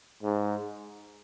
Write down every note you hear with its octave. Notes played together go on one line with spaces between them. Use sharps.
G#2